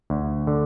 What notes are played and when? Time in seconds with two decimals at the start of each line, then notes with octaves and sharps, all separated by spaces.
0.10 D2
0.47 D3